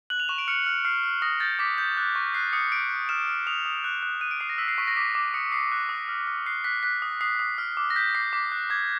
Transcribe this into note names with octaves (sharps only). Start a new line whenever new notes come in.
F#6 F#7
F7
C#6 E7
D7
F6 C#7
F6
F6 C7
F6
D#6 A#6
G6 A6
D6 B6
G6
F#6
C#6
F#6 C7
D#6 C#7
G6 D7
G6
F6 E7
F6
D#6 F7
D#6
F#6
F#6
F#6 D#7
D7
D#6 C7
A#6
E6 B6
C7
C#6 B6
A#6
D6 B6
D6
D#6 C#7
D#6 C7
F#6
D#6
F6
F6
F#6 C7
F#6 B6
F#6 B6
D#6
D#6 C7
D#6
F6
D6
A#6
G6 B6
D6 C7
D6 B6
F#6
D6 G#6